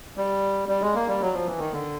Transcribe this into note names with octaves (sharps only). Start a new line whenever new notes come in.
G3
G3
G#3
A#3
G3
F#3
F3
E3
D#3
D3